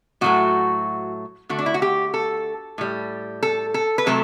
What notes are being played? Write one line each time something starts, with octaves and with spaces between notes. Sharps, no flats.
A2 F#3 A3 F#4
D3 A3 F#4
D4
E4
F#4
G4
A4
A2 G3
A4
A4
B4
C3 F#3 A3 A4